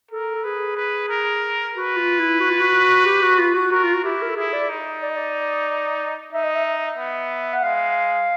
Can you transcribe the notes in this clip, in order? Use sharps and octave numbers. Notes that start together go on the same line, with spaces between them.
A4 A#4
A4
G#4 B4
B4
A#4
F#4 B4
F4
E4
F#4
F4
F#4
G4
F#4
F4
F#4
F#4 A#4
F4
F#4
E4 G4
A#4
A4
E4 G#4
D5
D#4
D5
D#5
D5
D#4 E5
D#5
E5
B3
F#5
G#3 F5